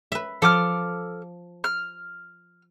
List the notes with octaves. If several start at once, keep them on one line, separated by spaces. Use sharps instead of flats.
B4 E5
F3 A4 D6 F6
F6